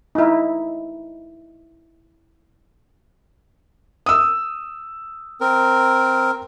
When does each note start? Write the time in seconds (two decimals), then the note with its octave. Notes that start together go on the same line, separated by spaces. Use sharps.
0.15 D#4 E4
4.06 D#6 E6
5.41 C4 A#4